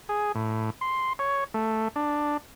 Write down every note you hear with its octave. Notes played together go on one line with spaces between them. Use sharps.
G#4
A2
C6
C#5
A3
D4